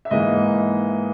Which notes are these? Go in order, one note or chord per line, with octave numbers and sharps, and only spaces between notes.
E5
G#2 E3 A#3 D#5